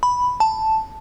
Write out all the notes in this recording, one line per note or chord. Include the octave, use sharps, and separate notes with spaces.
B5
A5